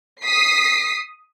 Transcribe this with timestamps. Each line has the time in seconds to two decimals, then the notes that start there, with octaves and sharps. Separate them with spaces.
0.25 D#6 B6 C7